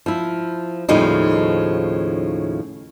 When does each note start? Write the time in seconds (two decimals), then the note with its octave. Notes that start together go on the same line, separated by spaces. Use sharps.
0.06 F3 E4
0.89 D#2 A2 C#3 F3 G3 D#4